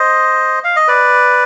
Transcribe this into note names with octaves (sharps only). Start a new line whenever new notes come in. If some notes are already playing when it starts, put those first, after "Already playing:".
Already playing: C5 D#5
F5
D#5
B4 D5